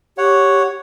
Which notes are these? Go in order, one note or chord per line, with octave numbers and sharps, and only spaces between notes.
G4 C#5 F#5